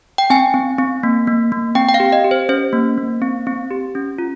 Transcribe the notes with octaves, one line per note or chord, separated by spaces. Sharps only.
G5
C4 G#5
C4
C4
A#3
A#3
A#3
C4 G5
G5
F5
G4
D#5
G4
C5
C#4 C5
A#3
A#3
C4
C4
G4
C#4
F4